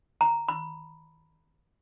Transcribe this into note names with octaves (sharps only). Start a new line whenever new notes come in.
A#5
B5